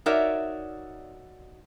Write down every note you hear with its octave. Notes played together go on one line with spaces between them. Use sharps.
D#4 F#4 A#4 C#5 D5 E5